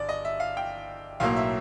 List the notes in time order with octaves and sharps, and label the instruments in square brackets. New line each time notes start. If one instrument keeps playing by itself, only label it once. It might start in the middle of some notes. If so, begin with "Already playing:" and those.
Already playing: [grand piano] G1 D5
D#5
E5
F5
G5
B1 A2 F#3 A#3 F5
E5